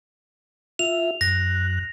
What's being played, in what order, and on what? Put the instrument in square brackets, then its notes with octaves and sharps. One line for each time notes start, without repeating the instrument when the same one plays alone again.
[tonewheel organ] F4 E5 [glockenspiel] F7
[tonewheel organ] F#2 F#6 [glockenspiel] A#6